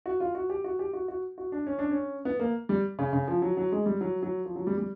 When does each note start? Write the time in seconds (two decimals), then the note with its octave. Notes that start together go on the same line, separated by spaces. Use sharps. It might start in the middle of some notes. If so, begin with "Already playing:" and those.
0.06 F#4
0.20 F4
0.35 F#4
0.50 G4
0.64 F#4
0.79 G4
0.93 F#4
1.08 F#4
1.38 F#4
1.52 D4
1.67 C#4
1.79 D4
1.91 C#4
2.25 B3
2.40 A#3
2.69 G3
2.99 C#3
3.13 C#3
3.27 F3
3.42 F#3
3.57 F#3
3.72 G#3
3.86 G3
4.01 F#3
4.22 F#3
4.45 F3
4.56 F#3
4.67 G3
4.78 G3